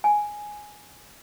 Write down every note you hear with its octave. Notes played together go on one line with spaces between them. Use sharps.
G#5